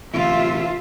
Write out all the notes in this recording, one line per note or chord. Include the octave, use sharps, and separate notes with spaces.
A1 D2 C3 F4 E5